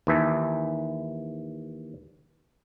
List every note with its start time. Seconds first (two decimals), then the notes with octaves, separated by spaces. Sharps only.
0.07 D#2 E3 E5 A5